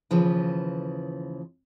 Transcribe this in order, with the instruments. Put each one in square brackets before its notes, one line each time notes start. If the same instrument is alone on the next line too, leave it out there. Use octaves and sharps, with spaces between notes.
[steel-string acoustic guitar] D#2 C#3 E3 F3 B4